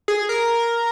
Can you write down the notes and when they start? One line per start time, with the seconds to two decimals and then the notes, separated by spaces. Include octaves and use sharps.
0.08 G#4
0.29 A#4